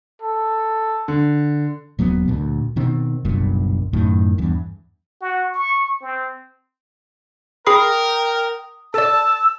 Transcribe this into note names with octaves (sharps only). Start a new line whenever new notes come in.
A4
D3
D#1 F#3 A#3 B3
D2 A#2
B2 D#3 C4
F#1 B1 G2 A#2
F#2 A2 D#3
E2 G2
F#4
C#6
C4
G#4 A#4 G5 B5 D#6 C7
A4 D5 A5 E6